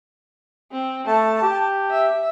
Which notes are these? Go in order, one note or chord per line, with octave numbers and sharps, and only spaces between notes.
C4
A3 A5
G4
E5